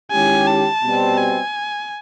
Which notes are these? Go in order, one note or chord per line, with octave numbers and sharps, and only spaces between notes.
D#3 G#3 C#4 E4 G4 G#5
A5
B2 G3 C4
G#5